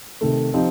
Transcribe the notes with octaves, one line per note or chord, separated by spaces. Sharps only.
C3 D#3 A3
F3 C4 D#4 G4